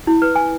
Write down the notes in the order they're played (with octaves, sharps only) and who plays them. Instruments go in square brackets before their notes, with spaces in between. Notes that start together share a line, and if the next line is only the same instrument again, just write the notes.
[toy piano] E4
B4
G#5